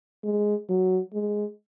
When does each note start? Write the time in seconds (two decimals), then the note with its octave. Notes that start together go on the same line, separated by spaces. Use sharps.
0.24 G#3
0.70 F#3
1.14 G#3